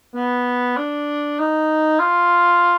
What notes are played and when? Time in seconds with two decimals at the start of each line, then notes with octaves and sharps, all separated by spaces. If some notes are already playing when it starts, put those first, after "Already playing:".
0.14 B3
0.77 D4
1.39 D#4
1.99 F4